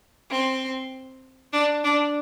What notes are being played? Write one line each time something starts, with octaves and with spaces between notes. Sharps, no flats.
C4
D4
D4